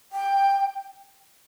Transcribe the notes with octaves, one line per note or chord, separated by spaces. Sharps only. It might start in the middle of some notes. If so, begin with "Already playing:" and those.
G5